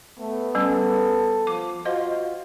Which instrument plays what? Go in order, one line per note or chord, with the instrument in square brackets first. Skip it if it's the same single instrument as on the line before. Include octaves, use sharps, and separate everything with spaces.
[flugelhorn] A3 [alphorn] B3
[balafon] G3 C#4 [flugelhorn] A4
[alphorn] F3 [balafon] D6
[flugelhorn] F4 [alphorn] F#4 [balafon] C5 D#5